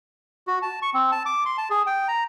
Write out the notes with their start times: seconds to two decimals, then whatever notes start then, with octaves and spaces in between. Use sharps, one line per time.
0.47 F#4
0.62 A5
0.82 C#6
0.94 C4
1.12 A5
1.26 D6
1.45 C6
1.58 A5
1.70 G#4
1.86 G5
2.08 A#5